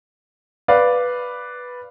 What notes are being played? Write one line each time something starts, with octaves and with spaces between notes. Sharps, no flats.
B4 D5 F5